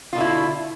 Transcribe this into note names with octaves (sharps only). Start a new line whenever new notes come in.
B2 D3 E4 F4